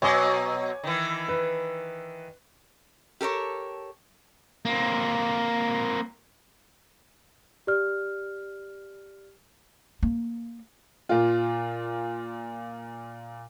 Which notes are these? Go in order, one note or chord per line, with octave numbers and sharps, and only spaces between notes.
B2 F#3 C#5 D#5 G#5 D6
D#3 E3
B4
G4 A4 A#4 C#5
A#3 C4
G4 D5 F6
A#3
A#2 F4